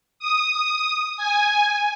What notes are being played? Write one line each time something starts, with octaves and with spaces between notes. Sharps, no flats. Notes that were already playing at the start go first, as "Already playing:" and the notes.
D#6
G#5